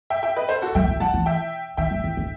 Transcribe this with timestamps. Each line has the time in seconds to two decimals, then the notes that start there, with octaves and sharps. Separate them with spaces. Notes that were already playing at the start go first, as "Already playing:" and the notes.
0.10 E5 G5
0.23 E5 G5
0.36 B4 D#5
0.49 A4 C5
0.62 F#4 A4
0.75 F#3 E5 G5
0.87 E3
1.00 F#3 F#5 A5
1.14 E3
1.26 E5 G5
1.77 D#3 E5 G5
1.91 F#3
2.04 E3
2.17 D#3